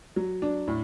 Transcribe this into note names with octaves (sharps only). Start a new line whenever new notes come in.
F#3
D4
A2